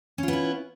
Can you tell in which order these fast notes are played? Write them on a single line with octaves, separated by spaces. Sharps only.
C#4 F4 B3 E4